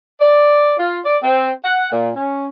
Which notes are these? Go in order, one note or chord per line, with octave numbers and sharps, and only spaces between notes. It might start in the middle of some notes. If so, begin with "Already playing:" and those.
D5
F4
D5
C4
F#5
A#2
C#4